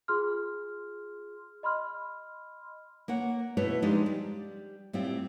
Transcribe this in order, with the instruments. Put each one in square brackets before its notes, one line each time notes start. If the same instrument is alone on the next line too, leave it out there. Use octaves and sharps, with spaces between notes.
[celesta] F4 G#4 C6 F6
D#5 B5 C6 F6
[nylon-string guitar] A#3 C#5 F#5
B2 A3 E4 B4 C#5
F3 G#3 D4 D#4 G4
G3
A2 G3 C4 F4